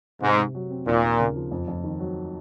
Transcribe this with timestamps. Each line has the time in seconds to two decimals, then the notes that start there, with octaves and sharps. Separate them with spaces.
0.21 G#2 C3
0.37 C3
0.55 F#3
0.70 C4
0.86 D#2 A#2
1.03 A#3
1.19 C#3
1.36 F3
1.52 F2
1.68 F2
1.84 D#3
2.00 F#3